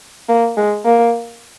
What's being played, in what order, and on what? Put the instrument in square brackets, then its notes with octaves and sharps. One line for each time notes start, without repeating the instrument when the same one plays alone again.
[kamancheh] A#3
G#3
A#3